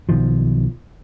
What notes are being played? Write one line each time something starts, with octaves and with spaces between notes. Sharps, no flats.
B1 B2 D#3 F3